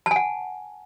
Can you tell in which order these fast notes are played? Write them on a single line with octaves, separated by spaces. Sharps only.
A5 G#5 F#5